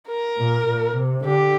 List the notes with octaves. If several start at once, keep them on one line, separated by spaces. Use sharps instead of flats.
A#4
A#2
A#2
C3
D3 G4